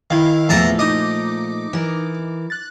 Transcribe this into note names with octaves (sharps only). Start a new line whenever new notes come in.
D#3 E4 F5
E2 A#2 F3 A3 A5 A#5
D#4 D#5 D6
E3 A#4
F#6 A6